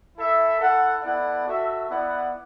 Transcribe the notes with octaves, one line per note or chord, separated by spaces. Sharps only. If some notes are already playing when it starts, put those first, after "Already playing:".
E4 A4 E5
E4 A4 F#5
B3 E4 A4 D5 F#5
F#4 A4 E5
B3 E4 D5 F#5